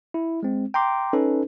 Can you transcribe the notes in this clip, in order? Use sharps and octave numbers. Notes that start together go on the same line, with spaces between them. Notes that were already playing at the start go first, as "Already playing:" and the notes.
E4
G#3 C4
G5 A#5 C6 D6
C#4 D#4 A4 B4